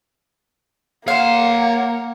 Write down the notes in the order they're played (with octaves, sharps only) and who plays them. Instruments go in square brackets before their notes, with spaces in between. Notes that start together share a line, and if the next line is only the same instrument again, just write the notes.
[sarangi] A#3 [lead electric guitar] C#5 C6 [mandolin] F5 [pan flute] F#5